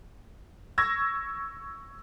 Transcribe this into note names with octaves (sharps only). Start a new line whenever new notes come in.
C#6 E6 G#6 A#6